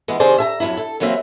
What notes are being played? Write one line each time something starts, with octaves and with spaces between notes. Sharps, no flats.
E3 G#3 B3
C3 D#3 C4 G#4 C5 D5
E5 G#5 A#5
F2 C#3 F#3 E4
A4
E3 F#3 A#3 C4 E5